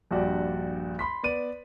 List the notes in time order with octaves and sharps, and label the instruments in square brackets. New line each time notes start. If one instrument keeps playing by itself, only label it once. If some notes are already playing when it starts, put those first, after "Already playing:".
[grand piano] A#1 G2 F#4 G4 D5
B5 C6 B6
B3 D5 D#7